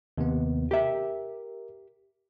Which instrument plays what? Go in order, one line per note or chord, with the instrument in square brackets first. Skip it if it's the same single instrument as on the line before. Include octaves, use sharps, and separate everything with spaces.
[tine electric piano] D#2 C3 B3
[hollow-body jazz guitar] G4 E5 [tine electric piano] A#4